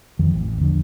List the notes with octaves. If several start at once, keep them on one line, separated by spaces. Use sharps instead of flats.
F2 D#3 E3
A1
E2 D3 F3 D4